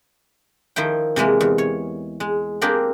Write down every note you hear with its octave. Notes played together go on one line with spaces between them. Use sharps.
D#3 F3 E4 G5
C3 E3 G#3 A#3
E2
C#5
G#3
A#3 C4 D4 G4 G#4 A#4